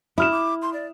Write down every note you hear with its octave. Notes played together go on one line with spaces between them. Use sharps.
E4 F#4 D#6 F6 E7
D6
C6
D5